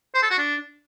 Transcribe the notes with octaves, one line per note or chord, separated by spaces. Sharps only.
C5
A4
F#4
D4